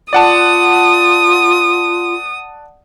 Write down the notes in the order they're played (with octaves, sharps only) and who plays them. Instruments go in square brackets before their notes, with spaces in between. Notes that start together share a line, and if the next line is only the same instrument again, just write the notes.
[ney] F4 [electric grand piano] D5 F#5 A5 [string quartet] D#6